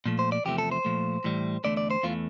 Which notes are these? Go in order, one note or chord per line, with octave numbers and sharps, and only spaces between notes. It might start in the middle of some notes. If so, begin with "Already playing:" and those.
A#2 F3 A3
C5
D5
E2 C3 F3 A3 G4
A4
C5
A#2 F3 A3
A2 E3 G3
E2 D3 A3 D5
D5
C5
E2 E3 A3 F4